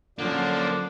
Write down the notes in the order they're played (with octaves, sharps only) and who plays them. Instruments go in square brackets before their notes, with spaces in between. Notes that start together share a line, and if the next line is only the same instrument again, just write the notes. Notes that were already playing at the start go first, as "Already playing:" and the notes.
[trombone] D3 [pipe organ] F3 D4 [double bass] F#3 C#4 [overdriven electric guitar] A#3